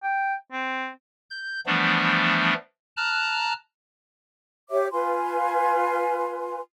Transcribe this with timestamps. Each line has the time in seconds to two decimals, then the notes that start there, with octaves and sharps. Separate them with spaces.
0.03 G5
0.52 C4
1.30 G6
1.66 E3 F3 G3 A3 B3 D4
2.97 A5 A#5 F6 F#6
4.70 G4 C#5 E5 D6
4.92 F4 B4 G#5 C6